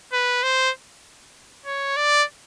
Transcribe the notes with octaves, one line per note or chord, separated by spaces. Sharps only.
B4
C5
C#5
D5